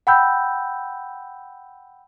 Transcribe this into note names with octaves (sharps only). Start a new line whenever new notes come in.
F#5 G5 B5 E6 G6